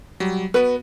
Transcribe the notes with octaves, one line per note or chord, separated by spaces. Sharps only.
F#3 G3
B3 F#4 B4